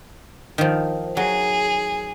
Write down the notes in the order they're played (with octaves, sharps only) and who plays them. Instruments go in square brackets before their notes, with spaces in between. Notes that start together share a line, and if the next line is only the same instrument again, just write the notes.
[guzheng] D#3 F3
[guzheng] F#3 [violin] G#4